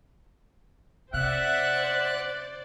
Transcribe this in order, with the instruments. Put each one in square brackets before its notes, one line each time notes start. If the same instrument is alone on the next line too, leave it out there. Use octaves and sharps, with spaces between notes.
[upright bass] C3 [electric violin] C5 D5 [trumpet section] E5 F#5 [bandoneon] F#6